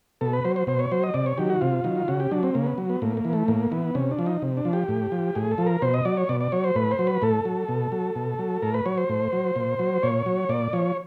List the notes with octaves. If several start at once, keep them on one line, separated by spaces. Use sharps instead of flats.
B2 A4
B4
F#3 C5
C5
B2 C5
C#5
F#3 C5
D#5
C3 D5
C#5
D#3 F#3 G4
F#4
C3 F4
D#3 F#3
C#3 F#4
G4
F#3 D4
C4
C#3 A#3
B3
F#3
B3
A2 A#3
A#3
E3
A3
A2 A#3
E3 B3
C3 C#4
D4
F3
D#4
C3
D4
F3
G4
A2
F3
A2 G#4
A4
F3
A#4
B2 C5
D#5
F#3 D5
C#5
B2 D5
D5
F#3 C#5
C5
A2 B4
C5
F#3
B4
A2 A4
F#3
B2
F#3
B2
F#3
A2 A#4
B4
F#3 C#5
C5
A2
F#3
A#2
F#3
A#2 C#5
F#3
A#2 D5
F3 C#5